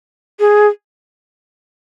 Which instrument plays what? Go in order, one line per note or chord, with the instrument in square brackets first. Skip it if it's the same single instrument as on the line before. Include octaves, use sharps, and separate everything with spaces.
[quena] G#4